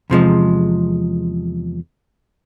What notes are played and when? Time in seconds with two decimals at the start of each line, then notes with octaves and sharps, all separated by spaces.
0.10 E2 C3 F3 G#3